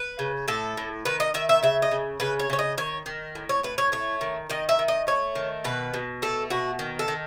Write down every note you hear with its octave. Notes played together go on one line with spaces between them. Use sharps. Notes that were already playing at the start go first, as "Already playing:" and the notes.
Already playing: B4
C#3
A2 A4
A2
D#3 B4
D#5
D#3 E5
E5
C#3 E5
D#5
C#3
C#3 B4
C#5
C#3 C#5
D#5
D#3 C#5
D#3
A2
C#5
A2 B4
C#5
A3 C#5
D#3
D#3 D#5
E5
D#3
D#5
A3 C#5
D#3
B2 B4
B2
A3 A4
B2 F#4
D#3
A4
D#3